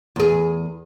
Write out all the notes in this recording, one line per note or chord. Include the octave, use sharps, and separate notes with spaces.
E2 G#4